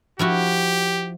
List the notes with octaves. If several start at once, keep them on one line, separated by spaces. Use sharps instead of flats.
F3 E4 F#4 G4